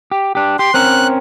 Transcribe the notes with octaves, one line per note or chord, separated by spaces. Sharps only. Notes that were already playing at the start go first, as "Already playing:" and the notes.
G4
D4 G4
G4 C6
C4 C#4 A#4 F#6